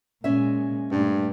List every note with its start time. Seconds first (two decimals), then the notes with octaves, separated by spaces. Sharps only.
0.24 A#2 G#3 C#4 E5
0.91 G2 A#2 A3